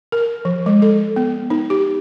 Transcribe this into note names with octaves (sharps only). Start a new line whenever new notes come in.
A#4
F3
G#3
A4
B3
D#4
G4